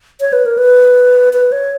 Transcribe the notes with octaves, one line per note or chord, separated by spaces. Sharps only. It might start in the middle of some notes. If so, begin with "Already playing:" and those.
C#5
B4
A#4
B4
B4
C#5